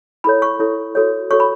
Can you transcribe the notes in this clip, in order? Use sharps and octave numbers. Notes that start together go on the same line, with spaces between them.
E4 A4 C#5 B5
C#6
E4 A4 C#5
F#4 A4 C#5
F#4 A4 C#5 C#6
B5